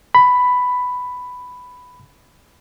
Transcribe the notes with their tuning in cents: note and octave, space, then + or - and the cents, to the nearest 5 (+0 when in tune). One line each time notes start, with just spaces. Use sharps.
B5 +5